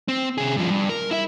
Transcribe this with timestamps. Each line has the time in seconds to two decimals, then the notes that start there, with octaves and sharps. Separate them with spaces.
0.08 C4
0.38 C3 G#4
0.57 G2 F3
0.69 G2
0.89 A#4
1.11 E4 E5